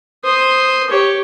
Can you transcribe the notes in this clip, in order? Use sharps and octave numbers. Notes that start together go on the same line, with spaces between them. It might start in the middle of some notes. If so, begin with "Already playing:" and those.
C5 D#6
G4 C#5